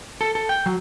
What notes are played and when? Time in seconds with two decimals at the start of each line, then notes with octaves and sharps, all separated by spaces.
0.21 A4
0.35 A4
0.49 G5
0.66 F#3